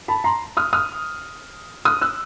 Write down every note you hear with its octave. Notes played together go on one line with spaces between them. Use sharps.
A5 B5
A#5 C6
D#6 F6
D#6 F6
D#6 F6
E6 F#6